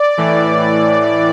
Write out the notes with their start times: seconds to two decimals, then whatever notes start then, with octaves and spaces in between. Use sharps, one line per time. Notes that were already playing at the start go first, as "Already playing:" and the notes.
Already playing: D5
0.18 A2 E3